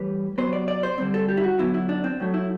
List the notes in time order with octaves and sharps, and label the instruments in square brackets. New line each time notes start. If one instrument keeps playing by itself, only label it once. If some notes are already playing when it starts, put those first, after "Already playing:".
Already playing: [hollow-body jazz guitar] A2 E3 G3 B4
C3 F#3 B3 C5
D5
D5
C5
D3 G3 C4
A4
G4
E4
F#4
D3 F#3 B3 E4
E4
D4
C4
A2 F#3 A3
E4